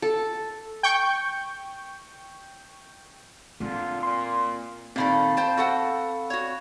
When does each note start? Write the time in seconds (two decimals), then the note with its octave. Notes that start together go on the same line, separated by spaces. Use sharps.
0.02 A4
0.83 G5 C#6 G6
3.60 A#2 D3 A#3 C4 F4
4.03 A#2 C6
4.96 A#2 D#3 C4 A4 F5 B5
5.37 C5 G5 A5
5.57 F#4 A4 F#5
6.30 F#4 C#5